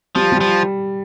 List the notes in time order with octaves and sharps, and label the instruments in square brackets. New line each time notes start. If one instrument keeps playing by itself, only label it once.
[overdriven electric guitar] F3 [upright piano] G3
[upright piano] G3
[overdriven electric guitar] F3